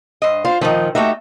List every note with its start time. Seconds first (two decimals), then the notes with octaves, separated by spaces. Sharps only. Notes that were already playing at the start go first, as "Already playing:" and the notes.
0.22 G2 C5 D#5
0.45 F4 C5
0.61 A#2 D#3 F3 D#4 D#5
0.95 A3 D#4 F#4 G4 E5